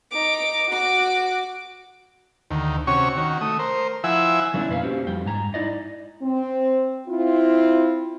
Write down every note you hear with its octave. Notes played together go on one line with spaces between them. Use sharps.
D#4 D6
F#4 D6
D2 D#3
C3 C#4 F#4 C#5 C#6
D#3 F#4
A3 D#6
A#4 C5
F3 E4 E5 F#5 G#5 E6
F#3 A3 B3 C#4 D4 E4
F2 B2 A#3 B4 F5 G#5
A#3 C#4 F#4 G4 C5
F2 G3 G5
G#2 G#5 A#5
D#4 E4 D5 D#5
C4
C4 E4 F4